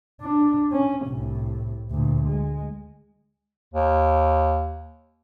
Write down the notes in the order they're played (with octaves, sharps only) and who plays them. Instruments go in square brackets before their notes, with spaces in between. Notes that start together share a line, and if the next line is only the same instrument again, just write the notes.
[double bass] D4
C#4
C2 A2
D2 A#2
G#3
[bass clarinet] D#2